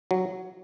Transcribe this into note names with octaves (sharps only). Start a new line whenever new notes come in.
F#3